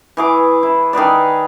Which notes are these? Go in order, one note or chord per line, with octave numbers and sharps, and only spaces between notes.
E3 G#4 D6
E4
D#3 G#4 B4 D5